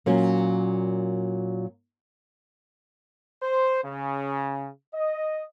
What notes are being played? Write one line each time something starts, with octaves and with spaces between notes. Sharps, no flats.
A#2 F#3 A#3 C#4
C5
C#3
D#5